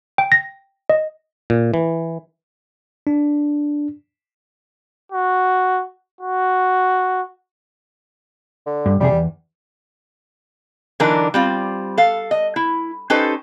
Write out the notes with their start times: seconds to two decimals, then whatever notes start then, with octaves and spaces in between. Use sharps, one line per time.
0.18 G5
0.32 A#6
0.90 D#5
1.50 A#2
1.74 E3
3.07 D4
5.12 F#4
6.21 F#4
8.66 D3
8.86 G2
9.00 F2 C3 G3 G#4
9.11 E2
11.00 D3 E3 F#3 D4 D#4 A#4
11.34 G3 C4 F4
11.98 A4 F5
12.31 D#5
12.56 E4
13.10 C#4 D#4 G4 A4 B4 C5